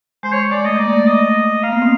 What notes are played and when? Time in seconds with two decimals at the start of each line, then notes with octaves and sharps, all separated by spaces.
0.23 G#3 C5
0.32 C#5
0.51 G#3 D5
0.65 A3 D#5
0.79 A#3 D5
0.93 A3
1.07 D#5
1.63 A#3 F5
1.72 B3
1.82 C4